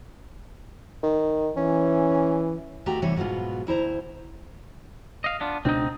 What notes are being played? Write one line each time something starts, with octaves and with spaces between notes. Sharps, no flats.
D#3
E3 C#4
D#2 A3 F#4 G4 A#5
C3 E3 G3 A3 C#5
G#2 B2 F#3 B3 F4
D2 E4 C5 A#5
D#5 F5
B3 D4 F4
C#2 B2 C4 D4 D#4